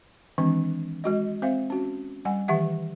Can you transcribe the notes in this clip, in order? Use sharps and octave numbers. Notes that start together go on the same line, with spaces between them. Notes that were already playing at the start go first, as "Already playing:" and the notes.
D#3 E3 G#3 C4 D4
G#3 F#4 D#5
C4 C5 E5 F5
C#4 F#4
G3 F#5 G#5
D#3 E3 G4 E5 F#5